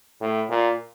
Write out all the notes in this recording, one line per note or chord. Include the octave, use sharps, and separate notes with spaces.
A2
A#2